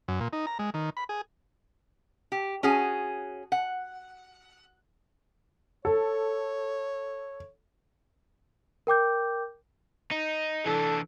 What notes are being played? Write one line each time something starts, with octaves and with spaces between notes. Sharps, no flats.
F#2
A#2
D#4
A#5
G#3
D#3
B5
G#4
G4
C#4 F#4 G#4
F#5
A4 C#5
A#4 G5 D6 G6
D#4
E3 D4 A4